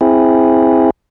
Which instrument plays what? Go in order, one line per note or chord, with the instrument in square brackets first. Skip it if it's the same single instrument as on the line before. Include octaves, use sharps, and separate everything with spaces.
[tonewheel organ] C4 E4 G#4